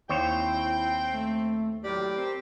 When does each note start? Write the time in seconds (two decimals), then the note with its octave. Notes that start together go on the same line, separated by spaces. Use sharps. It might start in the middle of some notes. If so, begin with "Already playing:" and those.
0.09 D#2 C4 E4 C5 C#5 G5
1.12 A3
1.84 A2 F#3 G4 A#4 D5
2.16 C4 A#4